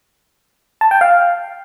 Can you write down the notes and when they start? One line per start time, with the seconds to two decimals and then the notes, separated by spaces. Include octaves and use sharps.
0.81 A5
0.91 G5
1.01 F5